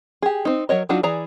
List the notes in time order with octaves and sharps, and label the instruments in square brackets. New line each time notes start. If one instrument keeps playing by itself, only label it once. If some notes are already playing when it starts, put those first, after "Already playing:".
[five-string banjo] G4 G#4
C4 D#4
F#3 A#4 C#5 D#5
F#3 D4 D#4 F4 F#4
E3 G#4 D5 A#5